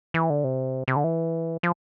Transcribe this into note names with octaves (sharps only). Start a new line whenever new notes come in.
E3
D3
C3
C3
D3
E3
F3